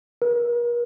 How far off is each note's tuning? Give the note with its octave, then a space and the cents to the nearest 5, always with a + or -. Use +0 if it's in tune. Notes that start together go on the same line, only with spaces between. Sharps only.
A#4 +40